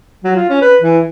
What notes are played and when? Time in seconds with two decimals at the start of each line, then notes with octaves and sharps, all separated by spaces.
0.24 F#3
0.35 F4
0.50 C#4
0.62 B4
0.81 E3